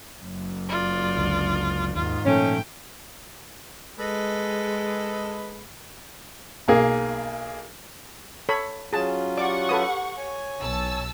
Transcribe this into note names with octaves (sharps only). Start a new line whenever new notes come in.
F#1 F#2
F4 D5
C#2 D3
D#2 G#2 D#3 F4
A#2 F3 A3 C#4 G5
G#3 A4 B4 D#5
B1 A#3 G#4
A4 C#5 B5
F#3 C#4 F4 G#4 A5
G4 D5 F#5 C#6 D6
A4 B4 D#6
C#5 G#5
B1 A5 E6